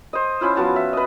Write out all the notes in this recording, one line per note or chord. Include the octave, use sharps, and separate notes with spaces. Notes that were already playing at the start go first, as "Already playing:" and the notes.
C5 D#5
C#4 E4 F4
F3 B3 F#4 A5
E5
B4 D#5